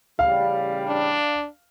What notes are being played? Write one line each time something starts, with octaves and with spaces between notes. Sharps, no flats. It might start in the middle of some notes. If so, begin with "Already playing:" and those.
A1 C#3 G3 F5
D4